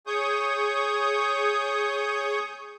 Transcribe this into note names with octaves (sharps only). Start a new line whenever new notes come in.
G#4 C#5 C#6 D#6 G6